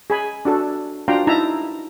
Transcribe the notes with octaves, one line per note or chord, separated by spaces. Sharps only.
G#4 G#5 B5
D4 F#4 A4
D4 F4 F#4 G5 A#5 C6
D#4 E4 E5 A5 A#5